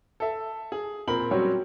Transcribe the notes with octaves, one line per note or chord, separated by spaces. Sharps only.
A4 E5
G#4
A#2 C4 A#4 B5 F#7
F#3 G3 C4 C#4 F#4 C#5